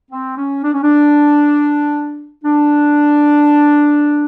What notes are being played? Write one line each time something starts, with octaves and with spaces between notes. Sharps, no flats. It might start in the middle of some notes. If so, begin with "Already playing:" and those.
C4
C#4
D4
C#4
D4
D4